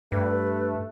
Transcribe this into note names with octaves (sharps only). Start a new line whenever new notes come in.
G2 A3 B4